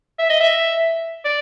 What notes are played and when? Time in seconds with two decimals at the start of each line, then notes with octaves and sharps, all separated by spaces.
0.19 E5
0.30 D#5
0.40 E5
1.25 D5